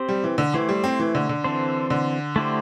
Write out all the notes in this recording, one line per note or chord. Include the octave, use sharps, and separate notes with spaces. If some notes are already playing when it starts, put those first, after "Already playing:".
Already playing: C4 G4 C5
G3
E3
D3
E3 A3 E4 G4 C5
G3
C4
E3
D3
D3
E3 C4 A4 C5
D3
A3 E4 G4 C5